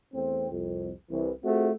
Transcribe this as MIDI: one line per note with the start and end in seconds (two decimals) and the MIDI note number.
0.13 0.48 40
0.13 0.48 57
0.13 0.48 60
0.50 0.90 36
0.50 0.90 41
1.09 1.31 36
1.09 1.31 52
1.44 1.69 57
1.44 1.69 60
1.44 1.69 65
1.44 1.69 66
1.44 1.69 68